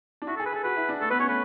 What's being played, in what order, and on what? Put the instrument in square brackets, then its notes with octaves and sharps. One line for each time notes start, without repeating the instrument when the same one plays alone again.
[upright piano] D4
[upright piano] E4 [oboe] F#4
[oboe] A4
[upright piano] G#4
[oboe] B4
[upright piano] G#4
[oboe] A4
[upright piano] F#4 [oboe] B4
[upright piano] E4
D4
[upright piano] A3 [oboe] A4
[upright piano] B3 [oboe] B4
[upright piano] C#4 [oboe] C#5
[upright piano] A3 [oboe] B4